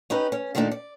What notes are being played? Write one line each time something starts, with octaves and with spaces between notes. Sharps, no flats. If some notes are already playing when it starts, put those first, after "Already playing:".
C#4 D#4 G4 B4
C#4
A#2 D#3 A3 D4 D#4
D5